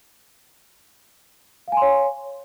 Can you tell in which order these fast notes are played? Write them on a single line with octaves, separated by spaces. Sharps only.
F5 G#5 C6 C#5